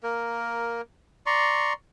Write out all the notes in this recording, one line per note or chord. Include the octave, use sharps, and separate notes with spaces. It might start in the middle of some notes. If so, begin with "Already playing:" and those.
A#3 A#4
D5 A#5 C6 C#6